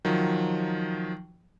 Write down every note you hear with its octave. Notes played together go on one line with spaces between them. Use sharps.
D#3 F3 F#3